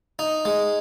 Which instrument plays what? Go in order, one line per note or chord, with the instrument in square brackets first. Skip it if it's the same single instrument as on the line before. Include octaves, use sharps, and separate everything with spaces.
[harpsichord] D#4
G#3